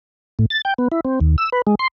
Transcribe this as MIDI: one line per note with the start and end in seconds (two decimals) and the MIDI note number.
0.39 0.46 45
0.50 0.61 93
0.65 0.74 79
0.78 0.88 59
0.92 1.00 64
1.05 1.19 60
1.20 1.36 39
1.38 1.50 88
1.53 1.62 71
1.67 1.75 56
1.79 1.88 84